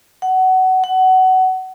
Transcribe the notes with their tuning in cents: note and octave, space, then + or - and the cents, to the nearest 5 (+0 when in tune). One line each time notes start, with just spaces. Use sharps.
F#5 +20
F#5 +20